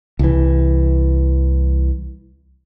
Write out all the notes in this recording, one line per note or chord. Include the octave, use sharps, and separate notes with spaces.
C2 E3